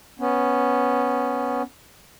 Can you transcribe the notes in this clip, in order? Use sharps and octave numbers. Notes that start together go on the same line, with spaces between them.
B3 C#4